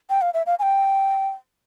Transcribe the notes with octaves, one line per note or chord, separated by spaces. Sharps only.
G5
F5
E5
F5
G#5
G5